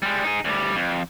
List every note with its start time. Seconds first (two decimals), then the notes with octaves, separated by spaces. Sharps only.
0.03 G3 G#3
0.24 D#4 G#4
0.45 D2 G3
0.76 F2